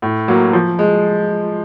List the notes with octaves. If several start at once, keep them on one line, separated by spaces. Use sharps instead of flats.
A2
F#3 A#3
F3
G#3